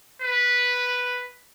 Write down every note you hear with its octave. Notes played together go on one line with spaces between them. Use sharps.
B4